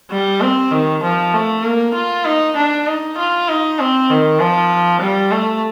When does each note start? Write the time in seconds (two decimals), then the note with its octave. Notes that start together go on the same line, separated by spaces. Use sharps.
0.10 G3
0.41 C4
0.72 D#3
1.03 F3
1.34 A3
1.64 A#3
1.94 F4
2.25 D#4
2.56 D4
2.87 D#4
3.17 F4
3.48 D#4
3.79 C4
4.10 D#3
4.40 F3
5.01 G3
5.32 A3